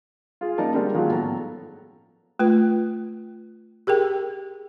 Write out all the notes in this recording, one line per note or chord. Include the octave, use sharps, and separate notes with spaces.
F4 G#4
F#2 A#3 D#4 A#4 D5 A5
D3 G3 G#3 C4 D4 A#4
D#3 F3 F#3 G#3 A#3 F4
A2 B3 A4 A#5
A3 F4 B4
G4 G#4 A#4 G5